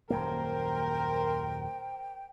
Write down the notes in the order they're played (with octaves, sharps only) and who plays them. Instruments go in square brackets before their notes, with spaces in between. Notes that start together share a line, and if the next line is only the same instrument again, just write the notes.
[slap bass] D#1 F#2 A#3 [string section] A#4 C5 [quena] G5